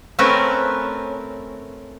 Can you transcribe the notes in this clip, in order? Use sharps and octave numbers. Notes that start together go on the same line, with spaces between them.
A3 C4 C#4 A#4 B4